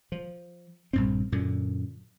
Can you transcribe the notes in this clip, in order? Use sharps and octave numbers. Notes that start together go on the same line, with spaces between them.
F3
A#1 G2 C4
F#2 A#2 D3